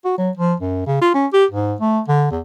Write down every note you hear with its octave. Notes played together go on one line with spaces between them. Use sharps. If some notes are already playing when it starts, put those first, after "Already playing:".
F#4
F#3
F3
F#2
C#3
F4
C#4
G4
G#2
A3
D3
E2